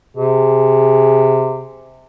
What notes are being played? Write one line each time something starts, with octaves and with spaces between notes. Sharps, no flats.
C3 G#4